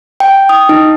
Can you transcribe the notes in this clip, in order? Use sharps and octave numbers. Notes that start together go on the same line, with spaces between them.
G5
D#6
D#4